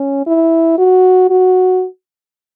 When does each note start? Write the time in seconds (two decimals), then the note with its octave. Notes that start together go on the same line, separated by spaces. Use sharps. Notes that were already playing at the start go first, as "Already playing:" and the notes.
Already playing: C#4
0.26 E4
0.78 F#4
1.30 F#4